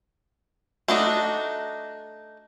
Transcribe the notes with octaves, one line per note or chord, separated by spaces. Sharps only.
A3 D4 D#4 F#4